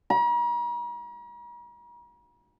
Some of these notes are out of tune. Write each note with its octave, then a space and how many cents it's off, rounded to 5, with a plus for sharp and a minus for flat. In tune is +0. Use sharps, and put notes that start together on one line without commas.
A#5 +45